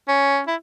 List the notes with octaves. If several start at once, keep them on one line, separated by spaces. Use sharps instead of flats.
C#4
E4